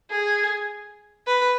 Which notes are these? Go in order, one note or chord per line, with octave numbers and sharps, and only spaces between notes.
G#4
B4